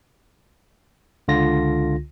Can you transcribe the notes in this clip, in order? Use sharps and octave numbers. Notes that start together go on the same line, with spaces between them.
C#2 D3 F4 A#6